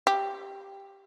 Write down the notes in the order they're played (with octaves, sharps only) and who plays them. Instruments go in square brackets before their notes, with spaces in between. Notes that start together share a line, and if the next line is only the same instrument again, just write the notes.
[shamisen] G4